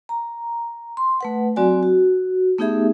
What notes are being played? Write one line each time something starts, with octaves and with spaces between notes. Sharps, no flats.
A#5
C6
A3 B4 F#5
F#3 C4 F#4 D5 G#5
F#4
A3 B3 D#4 G4 G#4 E5